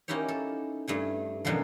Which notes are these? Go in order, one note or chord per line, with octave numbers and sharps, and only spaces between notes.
A#3 C#4 D#4 E4 G4 C#5
A4
G2 A3 G#5
F#2 B2 D3 E3 F3